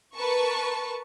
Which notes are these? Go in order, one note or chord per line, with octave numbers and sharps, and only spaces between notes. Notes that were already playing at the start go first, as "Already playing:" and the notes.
A#4 B4 A5 C#6